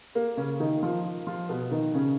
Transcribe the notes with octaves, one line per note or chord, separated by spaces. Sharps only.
A#3
C#3 C#4
D#3 D#4
F3 F4
F3 F4
B2 B3
D#3 D#4
C#3 C#4